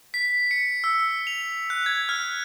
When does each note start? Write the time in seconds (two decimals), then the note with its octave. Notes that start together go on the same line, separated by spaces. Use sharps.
0.14 B6
0.51 C#7
0.84 E6
1.27 F7
1.70 F#6
1.86 G#6
2.09 F6